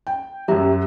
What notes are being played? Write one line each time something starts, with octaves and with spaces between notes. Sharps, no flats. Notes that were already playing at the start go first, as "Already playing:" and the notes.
G5
F#2 F#3 G4 E5 A#5